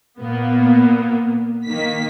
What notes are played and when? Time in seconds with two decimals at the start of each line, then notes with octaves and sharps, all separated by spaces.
0.19 A#2 A#3 B3
1.66 D#3 A#3 B6